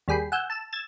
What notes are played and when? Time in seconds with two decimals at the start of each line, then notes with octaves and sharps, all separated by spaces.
0.08 D#2 G3 G#4 G5 B5 C7
0.32 F#5 G#5 E6 G6
0.50 A5 E6 E7
0.73 E6 G#6 A6 E7